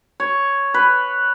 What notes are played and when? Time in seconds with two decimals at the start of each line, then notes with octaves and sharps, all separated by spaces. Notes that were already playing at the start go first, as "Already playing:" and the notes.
0.20 C#5
0.74 B4